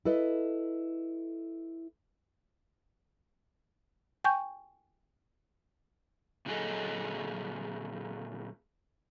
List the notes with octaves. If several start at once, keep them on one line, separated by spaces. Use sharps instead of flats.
E4 A4 B4 D#5
G5 G#5 C#6 G6
A#2 D3 F#3 G#4 A4 D#5